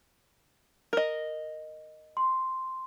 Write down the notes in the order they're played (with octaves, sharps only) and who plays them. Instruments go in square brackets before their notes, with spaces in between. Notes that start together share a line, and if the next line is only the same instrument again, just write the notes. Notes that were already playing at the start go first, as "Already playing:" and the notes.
[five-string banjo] A#4 D#5
[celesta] C6